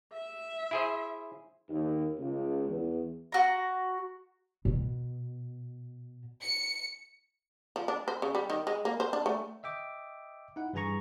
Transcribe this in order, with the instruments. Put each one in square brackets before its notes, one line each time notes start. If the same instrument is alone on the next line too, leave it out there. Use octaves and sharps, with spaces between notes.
[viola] E5
[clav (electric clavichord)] E4 G#4 C5
[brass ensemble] D#2
C#2
E2
[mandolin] F#4 A#5
[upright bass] B2
[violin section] C#7
[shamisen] F3
D4
C5
C#3
G3
D#3
G#3
A#3
C5
D4
A3
[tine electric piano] D#5 E5 G5 D6
D#4 E4 F#5
G2 E3 G#4 G#5 A#5 C#6